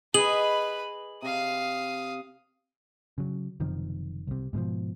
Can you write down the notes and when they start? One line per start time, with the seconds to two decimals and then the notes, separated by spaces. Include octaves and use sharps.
0.14 G#4 B4 D#5 B5 F#7
1.22 C3 F5 D#6
3.18 C#3 F#3
3.60 F#1 C3 D#3 F3
4.27 C2 C3
4.53 G#2 B2 D3 F3